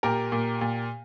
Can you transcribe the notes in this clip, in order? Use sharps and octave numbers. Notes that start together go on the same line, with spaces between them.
A#2 G4 A#4
A#2
A#2